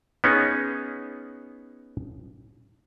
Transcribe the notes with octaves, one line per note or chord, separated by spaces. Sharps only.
B3 C#4 D#4 G#4